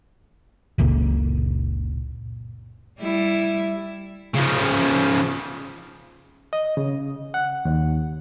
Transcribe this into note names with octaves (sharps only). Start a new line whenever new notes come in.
F#1 C#2 A#2
G3 E4
C#3 F3
D#5
C#3
F#5
D#2